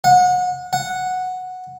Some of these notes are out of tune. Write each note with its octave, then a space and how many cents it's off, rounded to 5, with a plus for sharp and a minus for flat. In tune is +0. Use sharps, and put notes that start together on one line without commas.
F#5 -30
F#5 -5